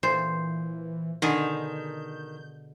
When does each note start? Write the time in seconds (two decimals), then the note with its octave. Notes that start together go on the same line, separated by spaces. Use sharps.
0.03 A#2 E3 C5
1.22 B2 D3 D#3 G#4 G6